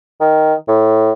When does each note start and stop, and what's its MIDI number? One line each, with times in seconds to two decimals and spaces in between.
0.21 0.54 51
0.68 1.12 45